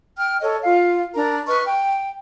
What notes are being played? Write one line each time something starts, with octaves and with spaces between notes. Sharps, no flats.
G5 F6
A4 C#5 D#5
F4 F5
D4 A#4 A#5
B4 D#5 C#6 F6
G5